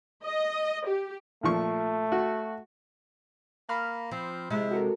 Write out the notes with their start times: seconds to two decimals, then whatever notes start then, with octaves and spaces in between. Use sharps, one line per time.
0.24 D#5
0.87 G4
1.43 A#2 F3 A3 C#6
2.12 F#4
3.69 A#3 B5 F6
4.11 F3 C4
4.50 C3 G#3 C4 E4
4.71 F#4 A4 A#4